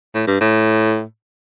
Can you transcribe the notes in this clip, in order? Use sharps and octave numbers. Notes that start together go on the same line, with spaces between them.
A2
G2
A2